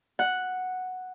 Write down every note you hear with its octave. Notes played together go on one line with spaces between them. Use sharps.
F#5